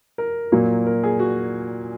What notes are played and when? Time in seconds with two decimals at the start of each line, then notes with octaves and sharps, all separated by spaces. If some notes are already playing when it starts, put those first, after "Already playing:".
0.18 A#4
0.52 A#2 F#3 A#3
0.86 A#4
1.03 G#4
1.19 F#4